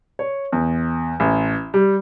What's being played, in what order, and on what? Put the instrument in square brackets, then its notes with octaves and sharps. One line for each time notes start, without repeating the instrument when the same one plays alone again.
[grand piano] C#5
E2
A1
G3